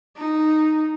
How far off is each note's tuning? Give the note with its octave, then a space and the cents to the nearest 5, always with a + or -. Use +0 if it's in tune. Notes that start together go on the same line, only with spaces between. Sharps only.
D#4 -5